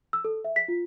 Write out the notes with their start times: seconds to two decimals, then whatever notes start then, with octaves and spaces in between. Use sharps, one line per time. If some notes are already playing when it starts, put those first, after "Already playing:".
0.13 E6
0.25 A4
0.45 E5
0.56 B6
0.68 F4